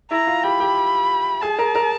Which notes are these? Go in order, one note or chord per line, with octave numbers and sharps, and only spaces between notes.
E4 E5 A#5
F4 F5
G4 G5 B5
G4 G5
G#4 G#5 A5
A#4 A#5
A#4 A#5